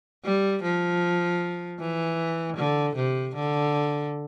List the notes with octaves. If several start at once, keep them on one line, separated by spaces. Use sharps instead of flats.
G3
F3
E3
D3
C3
D3